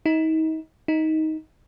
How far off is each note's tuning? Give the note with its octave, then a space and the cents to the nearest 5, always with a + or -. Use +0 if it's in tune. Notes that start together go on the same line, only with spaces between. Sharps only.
D#4 +35
D#4 +15